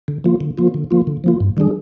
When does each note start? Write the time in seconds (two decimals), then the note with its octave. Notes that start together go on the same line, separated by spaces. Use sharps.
0.08 D3
0.24 F3 A#3 F4
0.41 D3
0.58 F3 A#3 F4
0.74 D3
0.91 F3 A#3 F4
1.07 D3
1.24 F3 A#3 F4
1.40 G2
1.57 D#3 G3 D4 G#4